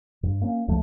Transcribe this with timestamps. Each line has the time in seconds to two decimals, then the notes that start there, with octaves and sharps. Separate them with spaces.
0.23 G2
0.42 A#3 C#4
0.68 C#2 F3 A3